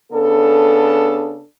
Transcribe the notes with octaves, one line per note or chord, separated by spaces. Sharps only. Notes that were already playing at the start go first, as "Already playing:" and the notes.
C#3 B3 D4 A4